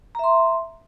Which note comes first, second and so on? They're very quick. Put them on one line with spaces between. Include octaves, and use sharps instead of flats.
A#5 E5 C6